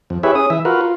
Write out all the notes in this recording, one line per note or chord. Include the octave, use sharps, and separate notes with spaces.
F2
E4 G4 G#4 B4 C#5 E5
C#4 G#4 D#6
E3 E5
F4 F#4 A#4 B4
F4